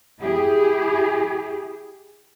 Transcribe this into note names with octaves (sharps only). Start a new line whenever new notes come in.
E4 G4 G#4